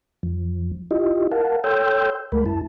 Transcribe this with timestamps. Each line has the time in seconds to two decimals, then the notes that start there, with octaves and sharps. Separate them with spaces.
0.23 F2 F3
0.91 E4 F4 G4 D#5
1.31 A#4 F5 F#5 A5
1.64 A4 C#5 G5 C6 E6 G6
2.32 D2 G#3 A3 A#4 B5
2.46 F#2 E4 A5